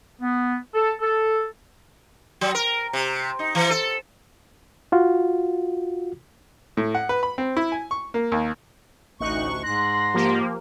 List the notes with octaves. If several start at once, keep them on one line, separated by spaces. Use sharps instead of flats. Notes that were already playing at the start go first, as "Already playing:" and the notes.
B3
A4
A4
F#3
A#4
C3
D#4
E3
A4
F4 F#4
A2
F#5
B4
B5
C4
E4
G#5
C#6
A#3
D#2
A1 D2 D#4 C#6 F#6
G#2 C6 F#6 A#6
F3 A#3 G4